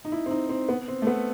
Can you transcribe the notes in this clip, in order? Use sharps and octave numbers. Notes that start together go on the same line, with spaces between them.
D#4
E4
C4
D#4
C4
B3
C4
A3
B3